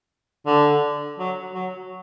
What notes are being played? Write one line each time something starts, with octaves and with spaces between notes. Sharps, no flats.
D3
F#3
F#3